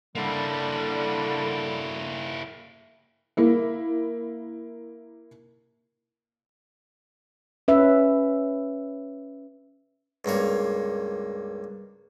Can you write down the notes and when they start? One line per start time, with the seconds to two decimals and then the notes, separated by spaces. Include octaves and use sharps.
0.15 D3 G3 A#3 E4
3.37 A#3 E4
7.68 C#4 B4 E5
10.25 C#2 G2 A#3 C#5